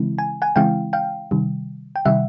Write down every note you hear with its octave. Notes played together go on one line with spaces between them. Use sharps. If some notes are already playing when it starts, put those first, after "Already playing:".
Already playing: C#3 E3 G#3 C4 E4
G#5
F#5 G#5
C#3 E3 G#3 C4 E4 F5 G5
F5 G5
C3 D#3 G3
G5
C3 D#3 G3 E5 F#5